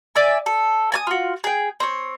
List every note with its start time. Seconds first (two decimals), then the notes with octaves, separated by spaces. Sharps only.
0.15 D5 E5 G#5
0.46 A4
0.92 G#5 A5 D#6
1.07 F4 F#4
1.44 G#4 G5
1.80 C4 C#5